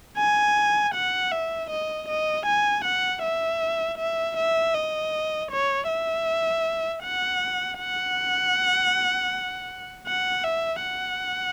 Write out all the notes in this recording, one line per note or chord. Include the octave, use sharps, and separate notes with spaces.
G#5
F#5
E5
D#5
D#5
G#5
F#5
E5
E5
E5
D#5
C#5
E5
F#5
F#5
F#5
E5
F#5